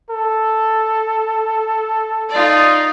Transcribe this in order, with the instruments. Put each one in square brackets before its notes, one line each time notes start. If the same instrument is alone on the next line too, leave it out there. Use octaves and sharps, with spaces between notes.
[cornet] A4
[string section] D#4 F4 D5